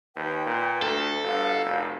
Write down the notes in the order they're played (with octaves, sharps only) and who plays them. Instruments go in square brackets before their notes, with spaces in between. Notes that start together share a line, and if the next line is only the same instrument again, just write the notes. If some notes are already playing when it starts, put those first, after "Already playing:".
[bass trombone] D#2 [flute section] B4 G5
[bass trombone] A#2
[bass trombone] D2 [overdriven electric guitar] A4
[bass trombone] G1 [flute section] F#4 F5 E6
[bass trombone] F1